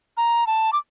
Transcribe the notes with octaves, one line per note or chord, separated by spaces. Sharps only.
A#5
A5
D6